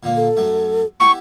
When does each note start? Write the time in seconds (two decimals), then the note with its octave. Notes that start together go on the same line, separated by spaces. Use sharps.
0.03 A#2 D3 A#3
0.17 A4
0.37 F#2 F#3 A3
1.00 B3 E4 G4 C#6